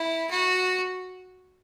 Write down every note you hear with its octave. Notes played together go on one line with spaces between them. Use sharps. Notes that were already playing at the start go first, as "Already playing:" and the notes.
Already playing: E4
F#4